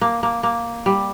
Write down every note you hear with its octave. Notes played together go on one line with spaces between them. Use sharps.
A#3
A#3
A#3
G3